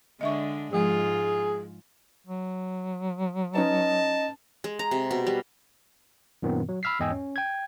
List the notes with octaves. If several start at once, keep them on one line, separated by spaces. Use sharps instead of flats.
D3 G#3 D4 D#5 E5 C#6
G#2 F3 G#3 F4 G#4
F#3
C#4 D#4 B4 D#5 A5
G#3
A#5
C3
B2
G3
F#2 A#2 D#3 B3 C4
F#3
B5 E6 F6 B6 C7
E2 G#2 D#5 G5 G#5 E6
C#4
G5 G#6